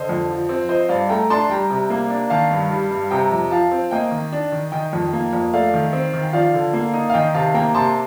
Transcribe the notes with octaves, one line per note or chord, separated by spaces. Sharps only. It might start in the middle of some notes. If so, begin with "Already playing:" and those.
Already playing: D3 C5 D#5
F2
F3
C4
F3 C5 D#5
G2 D5 F5
A3 G5 A#5
D4 A5 C6
G3 G5 A#5
C3
A#3
D4
D#3 F5 A5
G2
G3
G2
C3 G5 A#5
F2
F3 F5 A5
C4
A#3 D#5 G5
D#3
D4
D#3
D#3 D#5 G5
F2
A#3
F2
A3 D5 F5
D#3
C4
D#3
G5
F3 D5 F5
D3
A#3
D#4
F5
D#3 D#5 G5
C3 F5 A5
A#3 G5 A#5
C3 A5 C6